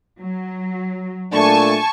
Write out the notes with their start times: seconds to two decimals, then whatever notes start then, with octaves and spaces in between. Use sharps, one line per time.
0.20 F#3
1.32 A#2 A3 D4 G#5 A5 C#6